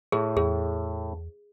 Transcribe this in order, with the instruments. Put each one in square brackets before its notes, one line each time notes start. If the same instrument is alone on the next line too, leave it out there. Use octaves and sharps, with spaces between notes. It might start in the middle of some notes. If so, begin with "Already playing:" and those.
[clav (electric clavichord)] A2 [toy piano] G#4
[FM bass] E2 [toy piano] G#4